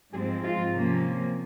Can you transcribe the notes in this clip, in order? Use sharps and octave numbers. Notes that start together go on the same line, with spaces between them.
G#2 F3 G#3 C4 G#4
F4
C3 F3 A#3 C#4